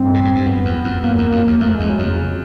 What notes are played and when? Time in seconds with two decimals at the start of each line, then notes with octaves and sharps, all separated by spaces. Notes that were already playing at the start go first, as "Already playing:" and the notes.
Already playing: G2 C4
0.14 A2
0.25 G#2
0.35 G2
0.46 F#2 B3
0.65 E2
0.84 F2
1.03 F#2 A#3
1.18 E2
1.32 F2
1.47 E2
1.60 F2 A3
1.75 E2 G#3
1.90 F#3
1.99 F2 C#3